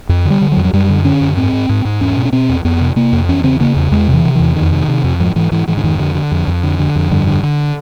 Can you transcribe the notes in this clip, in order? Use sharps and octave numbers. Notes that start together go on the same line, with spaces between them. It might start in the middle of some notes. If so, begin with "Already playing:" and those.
F2
D3
G3
D3
F#3
F2
F#3
F#2 G3
D3
D3 C#4
F#2
G#2 C4
G#2
G#2
G#2
E2 C#4
B2
C#4
B2 C4
E2
F2 B3
C3
C3 A#3
F2
E2 C#4
C#3 C4
C#3 A#3
E2
E2 G#3
C3
E3
C3
E2 E3
F2 D#3
C3
C3
F2
G#2 F3
G#2 E3
G#2 E3
G#2 E3
D3
F2 D#3
D3
D3
F2
F2
D3
D3
F2
G2 D3
D3
D3